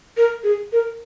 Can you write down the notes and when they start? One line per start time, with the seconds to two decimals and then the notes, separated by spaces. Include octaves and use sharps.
0.17 A#4
0.44 G#4
0.72 A#4